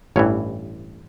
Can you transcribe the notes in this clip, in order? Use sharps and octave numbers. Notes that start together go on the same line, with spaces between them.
A1 G2 E3 C#5